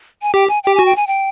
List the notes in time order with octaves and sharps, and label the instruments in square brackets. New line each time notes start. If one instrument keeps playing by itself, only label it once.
[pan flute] G#5
[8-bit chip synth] G4 [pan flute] G5
[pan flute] G#5
[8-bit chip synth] G4 [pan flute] G5
[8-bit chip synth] F#4 [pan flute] G#5
[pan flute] G5
G#5
G5